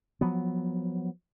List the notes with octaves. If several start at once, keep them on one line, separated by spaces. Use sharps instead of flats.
F3 F#3 B3